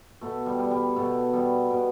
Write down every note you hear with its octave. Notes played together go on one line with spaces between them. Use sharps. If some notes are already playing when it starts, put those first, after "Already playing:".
B2 A3
G3
G3
G3
B2 A3
G3 B3
B2